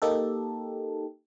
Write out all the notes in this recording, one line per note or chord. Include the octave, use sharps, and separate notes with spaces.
A#3 D#4 G4 A4